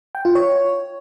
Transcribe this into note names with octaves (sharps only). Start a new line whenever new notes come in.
G5
F4
C#5